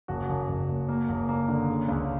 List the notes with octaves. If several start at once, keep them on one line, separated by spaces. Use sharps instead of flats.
F#1 F#4
F#1
F#1
F#1
A#3
F#1
A#3
D3
C#3
C#2